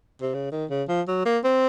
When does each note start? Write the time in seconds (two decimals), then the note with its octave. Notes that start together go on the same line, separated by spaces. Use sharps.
0.22 C3
0.34 C#3
0.52 D#3
0.70 C#3
0.88 F3
1.08 F#3
1.26 A#3
1.44 C4